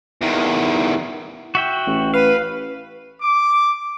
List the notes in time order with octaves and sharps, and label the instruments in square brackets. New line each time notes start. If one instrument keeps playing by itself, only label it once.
[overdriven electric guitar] E2 D#3
[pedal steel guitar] F#4 E5 G5
[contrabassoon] A1
[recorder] B4 [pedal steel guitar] F5
[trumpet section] D6